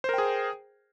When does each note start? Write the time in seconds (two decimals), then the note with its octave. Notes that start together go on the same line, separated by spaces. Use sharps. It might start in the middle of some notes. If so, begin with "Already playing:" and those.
0.04 C5
0.09 A#4
0.14 G5
0.18 G#4